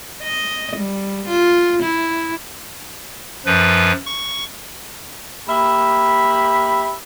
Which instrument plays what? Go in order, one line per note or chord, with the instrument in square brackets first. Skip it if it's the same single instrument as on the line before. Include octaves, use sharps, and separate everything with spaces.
[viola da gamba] D#5
G3
F4
E4
[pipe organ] F#2 F3 B4
C#6
[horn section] A#3 G4 E5 B5